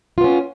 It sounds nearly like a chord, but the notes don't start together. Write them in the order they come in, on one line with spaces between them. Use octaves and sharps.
F4 B3 C#4